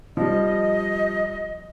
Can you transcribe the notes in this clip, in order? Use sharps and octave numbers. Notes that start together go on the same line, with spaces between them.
F3 G3 D#5